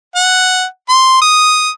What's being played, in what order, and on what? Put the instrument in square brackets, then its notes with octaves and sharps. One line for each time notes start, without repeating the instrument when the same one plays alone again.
[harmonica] F#5
C6
D#6